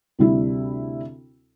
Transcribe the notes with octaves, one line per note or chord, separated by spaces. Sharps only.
D2 C3 G3 E4